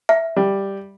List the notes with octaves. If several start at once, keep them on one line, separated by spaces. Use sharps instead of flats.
E5
G3